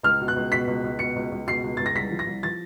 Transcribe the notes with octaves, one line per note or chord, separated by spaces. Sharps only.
C#2 F6
B2
F#6
C#2
B2 B6
C#2
C#2
B2 C#7
C#2
C#2
B2 C7
C#2
C#2 A6
A#6
C2 B6
F3
A#6
C2
F3 A6